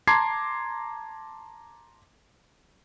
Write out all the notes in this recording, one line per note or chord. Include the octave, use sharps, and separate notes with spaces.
A5 A#5 C6 D6 G#6 C7